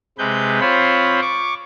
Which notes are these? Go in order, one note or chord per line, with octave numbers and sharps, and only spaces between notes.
C3 G#3 B4 G6
C4 F4 C5 C#5 B5
C#6 D6